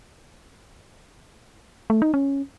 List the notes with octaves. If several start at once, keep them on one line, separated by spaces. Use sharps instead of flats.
A3
D#4
C#4